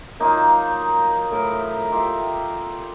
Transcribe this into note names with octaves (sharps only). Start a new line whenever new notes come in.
F#3 A#3 D#4 F4
A2 A#4 B5
F4 G4 E5 A#5